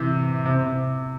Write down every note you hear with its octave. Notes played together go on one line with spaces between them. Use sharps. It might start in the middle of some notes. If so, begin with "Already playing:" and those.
Already playing: C3 E3
C3
C3